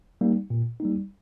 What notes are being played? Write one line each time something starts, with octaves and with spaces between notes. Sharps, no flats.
G3 A#3 D#4
A#2
G3 A#3 D#4